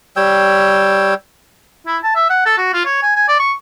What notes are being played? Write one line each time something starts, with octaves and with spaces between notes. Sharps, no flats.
G3 C#5 G5 E6
E4
A5
E5
F#5
A4
F#4
F4
C#5
G#5
G#5
D5
C#6